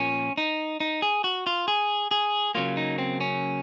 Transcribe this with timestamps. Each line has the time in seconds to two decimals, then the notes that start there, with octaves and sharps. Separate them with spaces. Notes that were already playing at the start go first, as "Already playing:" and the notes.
Already playing: A#2 F3 A#3 C#4
0.38 D#4
0.80 D#4
1.02 G#4
1.24 F#4
1.47 F4
1.68 G#4
2.11 G#4
2.55 C#3 F#3 A#3 F4
2.77 D#4
2.98 C4
3.21 C#4